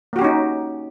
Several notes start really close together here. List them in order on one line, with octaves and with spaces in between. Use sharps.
A#3 F#4 G4 C#4 D#4